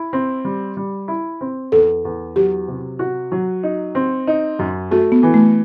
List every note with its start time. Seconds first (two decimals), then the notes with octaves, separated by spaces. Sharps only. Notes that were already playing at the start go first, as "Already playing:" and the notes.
Already playing: E4
0.13 C4
0.45 G3
0.77 G3
1.08 E4
1.41 C4
1.72 E2 A4
2.05 E2
2.36 F#3 G4
2.68 C3
2.99 F#4
3.32 F#3
3.63 D#4
3.95 C4
4.27 D#4
4.59 F#2
4.91 A3 F#4
5.12 B3
5.23 E3
5.34 A3